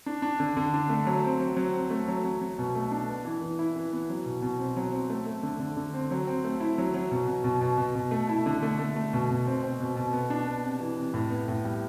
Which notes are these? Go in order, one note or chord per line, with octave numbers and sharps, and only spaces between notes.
D4
D4
D3
D3
D4
A3
F#3
C4
F#3
F#3
C4
A3
F#3
F#3
F#3
B2
A3
D4
B3
E3
E3
E4
E3
B3
F#3
B2
B2
C4
F#3
C4
A3
A3
D3
D3
D3
C4
F#3
C4
A3
E4
F#3
F#3
B2
B2
B2
B2
B2
B2
A3
E4
D3
A3
A3
A3
B2
B2
C4
C4
B2
B2
B3
D4
B3
C3
E3
C3
A2
B3
A2
G3